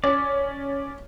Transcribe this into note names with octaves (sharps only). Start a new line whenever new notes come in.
C#4 D5